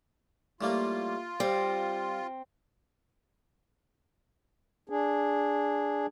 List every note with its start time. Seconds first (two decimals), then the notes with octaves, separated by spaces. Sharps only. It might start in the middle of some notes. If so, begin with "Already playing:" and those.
0.61 A2 G3 A#3 F4
1.40 G3 C4
4.89 D4 G#4